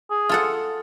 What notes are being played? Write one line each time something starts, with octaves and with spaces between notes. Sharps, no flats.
G#4
F4 A4 F#5